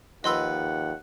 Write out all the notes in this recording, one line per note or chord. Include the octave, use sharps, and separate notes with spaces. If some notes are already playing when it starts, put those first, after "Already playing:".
D#2 F3 B4 D#5 F#5 C6 E6